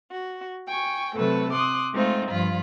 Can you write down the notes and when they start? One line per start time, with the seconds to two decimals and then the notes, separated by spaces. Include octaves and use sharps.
0.11 F#4
0.67 G5 G#5 C#6
1.15 C3 F#3 A3 A4 B4
1.53 C6 D6 D#6 F#6
1.93 G#3 A3 C4 D#4 F4
2.30 G2 F3 F4 B5